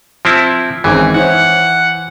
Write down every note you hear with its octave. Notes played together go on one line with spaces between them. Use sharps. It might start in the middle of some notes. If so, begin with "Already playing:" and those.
F3 C4 E4
G#1 E3 C4 C#4 G#4
E4 C5 C#5 F#5